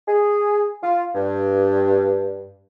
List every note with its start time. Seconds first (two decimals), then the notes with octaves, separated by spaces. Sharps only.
0.08 G#4
0.83 F4
1.15 G2